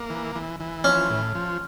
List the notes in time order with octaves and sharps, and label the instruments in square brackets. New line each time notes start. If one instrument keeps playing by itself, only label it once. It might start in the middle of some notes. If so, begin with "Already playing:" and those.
Already playing: [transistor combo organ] A#3
E3
E3
E3
[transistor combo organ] F3 [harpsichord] C#4
[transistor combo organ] A2
F3